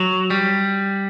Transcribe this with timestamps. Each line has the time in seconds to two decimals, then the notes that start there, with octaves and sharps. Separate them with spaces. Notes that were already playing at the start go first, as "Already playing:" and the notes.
Already playing: F#3
0.30 G3